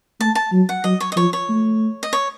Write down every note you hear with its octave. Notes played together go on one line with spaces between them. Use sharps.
A3 A5
A5
F#3
F#5
F#3 D#5
C#5
D#5
F3 C#5
C#5
A3
D#5
C#5